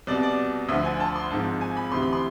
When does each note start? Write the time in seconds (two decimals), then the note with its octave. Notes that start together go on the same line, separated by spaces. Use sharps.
0.07 C2 D5
0.11 B2
0.23 D5
0.69 D2 D3 F3 E5
0.85 G#5
1.00 A5
1.16 C6
1.30 G#1 G#2 F3 A5
1.61 G#5
1.77 B5
1.92 D2 C3 E3 C6
2.03 B5
2.13 C6